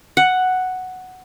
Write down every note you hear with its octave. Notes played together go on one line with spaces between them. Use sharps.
F#5